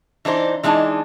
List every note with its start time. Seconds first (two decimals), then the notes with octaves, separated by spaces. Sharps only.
0.25 E3 D4 D#4 C5
0.63 E3 G#3 D4 D#4 A5